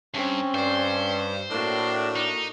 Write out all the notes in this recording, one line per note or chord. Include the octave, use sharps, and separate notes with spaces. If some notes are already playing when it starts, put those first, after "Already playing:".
G2 C4 C#4
G2 C5
A2 A#3 D4 F#4
D#4